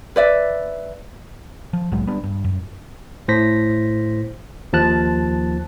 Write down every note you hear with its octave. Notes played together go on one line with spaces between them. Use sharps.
B4 D5 E5
F3
C2 A2 F#3 G#3
G3 B3 D4
G2
F#2
A2 C5 A#6 B6
D#2 F3 A5 F#6